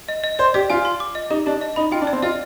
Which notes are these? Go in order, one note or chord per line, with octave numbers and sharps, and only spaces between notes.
D#5
D#5
C5 D5
G4 D5
F4 G#5
C6
D6
D#5
D#4 G4
D4 G4
D#5
D#4 B5
F4 G5
D4
D5
C4
F4 D#5